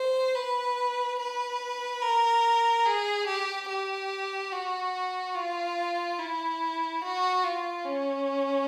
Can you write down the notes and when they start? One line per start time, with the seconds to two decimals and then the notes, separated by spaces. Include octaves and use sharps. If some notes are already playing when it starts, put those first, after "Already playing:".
Already playing: C5
0.35 B4
1.19 B4
2.02 A#4
2.86 G#4
3.27 G4
3.68 G4
4.51 F#4
5.35 F4
6.19 E4
7.02 F#4
7.44 F4
7.85 C#4